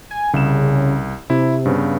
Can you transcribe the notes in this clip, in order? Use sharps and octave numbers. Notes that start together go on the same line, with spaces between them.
G#5
C2 C#3 E7
C3 E4
G2 C#3 B3